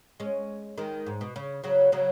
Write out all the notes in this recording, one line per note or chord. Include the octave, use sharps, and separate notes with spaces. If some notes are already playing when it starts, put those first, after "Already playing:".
G#3 C#4
D#3 G#3
G#2
B2
C#3
C#3 F#3
C#3 F#3